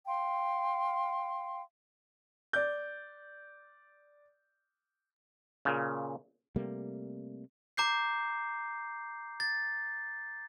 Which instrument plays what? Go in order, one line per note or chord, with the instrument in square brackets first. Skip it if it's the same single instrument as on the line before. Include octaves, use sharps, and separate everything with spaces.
[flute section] F5 G5 C6
[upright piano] D5 G6
[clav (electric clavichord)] A#2 C#3
[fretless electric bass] C3 G3 A3 A#3
[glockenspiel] A#5 D6 G6 C7
A6